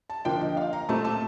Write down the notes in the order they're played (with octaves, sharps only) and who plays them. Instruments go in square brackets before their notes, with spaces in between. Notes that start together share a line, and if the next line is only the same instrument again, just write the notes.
[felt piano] A5
D3 F3 A#3 D4 G5
D#5
F5
A#5
A#2 A3 C4 A5
A5